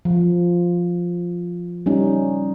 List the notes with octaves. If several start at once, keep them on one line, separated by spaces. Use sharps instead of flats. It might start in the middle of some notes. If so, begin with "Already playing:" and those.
F3
G3 C#4 D#4